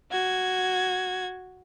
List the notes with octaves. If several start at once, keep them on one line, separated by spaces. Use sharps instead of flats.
F#4 G#6